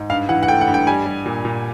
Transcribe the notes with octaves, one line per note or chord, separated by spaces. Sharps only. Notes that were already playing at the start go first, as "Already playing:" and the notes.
Already playing: G#2
G2 F5
E3 F#5
F#5
A3 G5
F#5
G2
G5
G3 G#5
G3
A#2
A#2